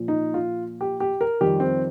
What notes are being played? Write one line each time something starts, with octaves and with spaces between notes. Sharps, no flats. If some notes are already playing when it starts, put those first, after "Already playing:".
Already playing: A#2 F3
D#4
F4
G4
G4
A#4
F2 D#3 G3 G4
C4